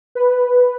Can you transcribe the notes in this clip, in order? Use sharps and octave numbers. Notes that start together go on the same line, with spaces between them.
B4